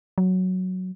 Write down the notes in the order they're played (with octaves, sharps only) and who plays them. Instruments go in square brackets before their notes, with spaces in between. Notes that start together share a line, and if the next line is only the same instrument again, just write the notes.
[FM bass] F#3